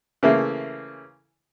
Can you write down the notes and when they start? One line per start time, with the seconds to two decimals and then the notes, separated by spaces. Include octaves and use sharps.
0.23 C#3 E3 A3 A#3